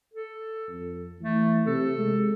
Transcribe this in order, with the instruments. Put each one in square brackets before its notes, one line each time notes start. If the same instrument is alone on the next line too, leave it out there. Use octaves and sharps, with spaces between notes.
[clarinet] A4
[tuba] F2
[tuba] E3 [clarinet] A3
[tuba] C3 [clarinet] A4
[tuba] G#3